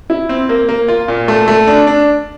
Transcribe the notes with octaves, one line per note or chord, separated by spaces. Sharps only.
E4
C4
A#3
A#3
F4
A#2
A3
A3
D4
D4